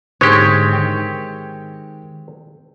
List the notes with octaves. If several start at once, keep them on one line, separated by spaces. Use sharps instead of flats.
G#2 D3 G#3 C4 G4 C#5
D#3 G5